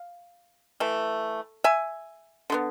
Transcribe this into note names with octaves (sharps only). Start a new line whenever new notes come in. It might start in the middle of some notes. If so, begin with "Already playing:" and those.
Already playing: F5
E3 A3
E5 G#5
D3 G#3 B3